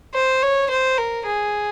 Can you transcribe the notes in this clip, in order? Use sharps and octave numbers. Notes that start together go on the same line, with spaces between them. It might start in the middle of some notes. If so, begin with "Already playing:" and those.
C5
C#5
C5
A#4
G#4